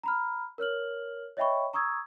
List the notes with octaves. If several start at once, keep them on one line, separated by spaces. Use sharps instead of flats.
A#5 B5 F6
A#4 C#5 F6 F#7
C#5 D#5 E5 G5 B5 C#6
A#5 C#6 D#6 E6 G#6